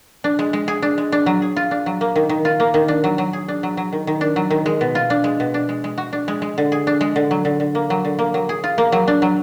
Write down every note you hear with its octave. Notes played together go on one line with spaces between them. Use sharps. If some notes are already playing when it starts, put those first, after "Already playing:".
D4
G#3
G#3
G#4
D4
G#3
D4
F#3
G#4
F4
D4
F#3
A#3
D#3
D#3
F4
A#3
D#3
D4
F#3
F#3
G#4
D4
F#3
F#3
D#3
D#3
D4
F#3
D#3
G#3
B2
F4
D4
G#3
B2
D4
G#3
G#3
F#4
D4
G#3
G#3
D3
G#4
D4
G#3
D3
F#3
D3
D3
A#3
F#3
D3
A#3
F#3
G#4
F4
A#3
F#3
D4
F#3